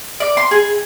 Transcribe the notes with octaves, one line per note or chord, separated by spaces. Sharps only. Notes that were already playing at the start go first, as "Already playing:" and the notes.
D5
C6
G#4